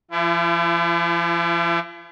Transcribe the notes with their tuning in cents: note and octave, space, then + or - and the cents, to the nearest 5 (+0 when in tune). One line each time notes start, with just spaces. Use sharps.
F3 -40 E4 +35